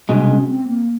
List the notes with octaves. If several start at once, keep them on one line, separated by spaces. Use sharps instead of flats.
C2 B2 G#3 D4
C#4
C4
A#3